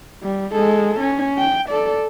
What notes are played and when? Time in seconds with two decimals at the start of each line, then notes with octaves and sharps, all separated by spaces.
0.23 G3
0.52 G#3 A4
0.99 C#4
1.38 G5
1.69 A4 D5